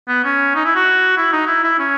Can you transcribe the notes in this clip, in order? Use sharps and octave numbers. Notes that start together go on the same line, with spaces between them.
B3
C#4
D#4
E4
F#4
E4
D#4
E4
E4
C#4